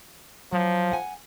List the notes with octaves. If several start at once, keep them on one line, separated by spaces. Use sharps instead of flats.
F3 F#3
F#5 G#5